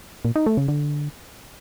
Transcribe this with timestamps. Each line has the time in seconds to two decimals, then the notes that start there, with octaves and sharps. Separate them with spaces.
0.25 A#2
0.36 D#4
0.46 A3
0.57 C#3
0.68 D3